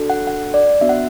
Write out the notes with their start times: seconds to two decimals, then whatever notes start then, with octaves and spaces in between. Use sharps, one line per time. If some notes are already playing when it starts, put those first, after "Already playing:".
Already playing: D4 F#4 A4
0.10 F#5
0.27 F#5
0.54 D5
0.81 B3 D4 F#4 E5
0.89 F#5